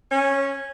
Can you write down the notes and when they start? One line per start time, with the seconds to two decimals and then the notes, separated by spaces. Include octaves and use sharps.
0.10 C#4